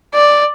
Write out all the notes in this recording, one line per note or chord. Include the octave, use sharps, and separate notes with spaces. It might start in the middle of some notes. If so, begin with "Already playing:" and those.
D5